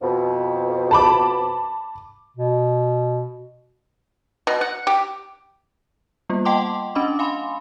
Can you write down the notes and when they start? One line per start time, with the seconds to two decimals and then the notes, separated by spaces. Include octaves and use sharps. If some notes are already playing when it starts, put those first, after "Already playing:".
0.01 F2 B2
0.91 A5 B5 D6
2.37 B2
4.47 B2
4.61 F#5
4.87 G4
6.29 G3 A#3 B3 F4
6.45 D#5 F#5 G5 A5 C6 D6
6.95 C#4 D4 D#5 B5 D6
7.19 F5 G#5 B5 C6